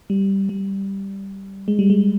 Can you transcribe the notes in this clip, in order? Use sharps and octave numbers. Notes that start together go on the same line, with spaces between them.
G3
G3
G#3
G3
G#3